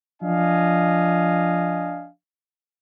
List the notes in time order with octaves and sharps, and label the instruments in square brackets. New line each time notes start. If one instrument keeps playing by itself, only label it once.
[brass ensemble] F3 D4 D#5 F5 G#5